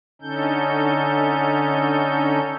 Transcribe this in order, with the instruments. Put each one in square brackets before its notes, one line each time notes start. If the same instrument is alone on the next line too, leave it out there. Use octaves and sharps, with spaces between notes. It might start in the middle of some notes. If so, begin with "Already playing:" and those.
[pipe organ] D3 C#4 D#4 A4 G6